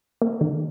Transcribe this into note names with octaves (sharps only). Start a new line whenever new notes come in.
A#3
D#3